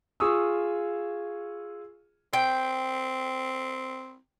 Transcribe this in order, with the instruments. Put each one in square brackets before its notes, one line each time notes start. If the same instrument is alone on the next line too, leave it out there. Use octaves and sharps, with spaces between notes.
[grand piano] F4 G#4 F5 C#6 D#6 E6
[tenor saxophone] C4 [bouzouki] G5